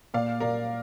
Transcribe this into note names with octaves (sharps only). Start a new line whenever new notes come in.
A#2 D5 F5
A#2 A#4 D5